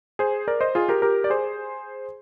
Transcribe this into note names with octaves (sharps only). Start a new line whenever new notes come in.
G#4 C5
A#4 D5
C5 D#5
F4 G#4
G4 A#4
G4 A#4
D5
G#4 C5